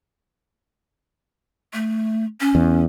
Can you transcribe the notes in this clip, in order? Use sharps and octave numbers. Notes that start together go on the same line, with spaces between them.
A3
C#4
E2